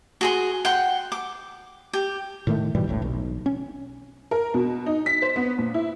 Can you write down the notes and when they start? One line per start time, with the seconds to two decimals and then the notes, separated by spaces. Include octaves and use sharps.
0.21 F#4 G#4 C6
0.65 F#5 G5 C6
1.12 D6
1.93 G4
2.47 A2 D#3 A3
2.75 G#2 B2 E3 G3
2.88 E1 A#1 A2
3.02 B1
3.46 C#4
4.31 A#4
4.54 B2
4.86 D#4
5.06 B6
5.22 C5
5.36 B3
5.58 A#2
5.74 E4